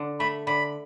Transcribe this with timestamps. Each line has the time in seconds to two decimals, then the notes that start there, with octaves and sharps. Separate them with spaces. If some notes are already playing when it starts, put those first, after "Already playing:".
Already playing: D3
0.20 A3 B5
0.47 D3 B5